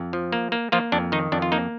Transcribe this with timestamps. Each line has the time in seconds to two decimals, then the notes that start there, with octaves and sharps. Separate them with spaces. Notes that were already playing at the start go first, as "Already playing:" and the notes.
Already playing: F2
0.13 F3
0.32 A#3
0.52 A#3
0.72 F3 A#3 F4
0.92 F2 D4
1.12 D#3 D#4
1.32 F2 D4
1.42 F4
1.52 A#3 D#4